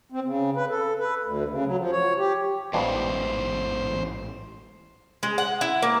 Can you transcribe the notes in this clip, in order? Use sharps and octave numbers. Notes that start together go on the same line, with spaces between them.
C4
C#3
B4
A4
B4
D2
C#3
F#3
F3
C#5
G4
A1 E2 G#2 B2 G3 F4 C5
G#3
F#5
E4
A#3